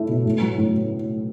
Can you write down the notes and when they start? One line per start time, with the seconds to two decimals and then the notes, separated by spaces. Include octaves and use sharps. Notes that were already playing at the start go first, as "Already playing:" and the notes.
Already playing: A3 E4
0.09 B2
0.25 A2
0.42 F#3
0.58 A2